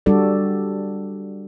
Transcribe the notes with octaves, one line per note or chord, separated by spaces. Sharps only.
G3 D4 F#4 A4 D5